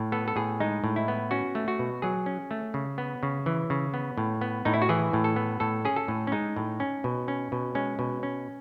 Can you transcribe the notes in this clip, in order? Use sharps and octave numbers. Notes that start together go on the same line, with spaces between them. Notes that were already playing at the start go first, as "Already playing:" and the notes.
Already playing: A2
B3 A4
A4
A2 G#4
G#3 D#4
A2
E4
B3
C#4 F#4
A3
F#4
B2
F#3 G#4
C#4
A3
C#3
B3
C#3
E3
C#3
B3
A2
B3
A2 D#4
E4
F#4
E3 G#4
A2
A4
B3
A2 A4
C#4 G#4
A4
A2
C#4
G#3 D#4
A2
C#4
B2
C#4
B2
G#3 C#4
B2
C#4